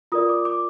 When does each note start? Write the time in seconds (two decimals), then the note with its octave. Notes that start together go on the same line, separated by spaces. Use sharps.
0.12 F4 A#4 D5 D#6
0.29 D6
0.45 D6